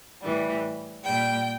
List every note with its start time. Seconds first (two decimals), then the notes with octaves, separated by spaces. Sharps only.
0.24 A2 E3 G3
1.05 A#2 G3 G5